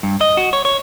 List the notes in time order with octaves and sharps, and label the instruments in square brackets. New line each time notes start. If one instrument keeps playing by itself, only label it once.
[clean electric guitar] G2
D#5
F#4
C#5
C#5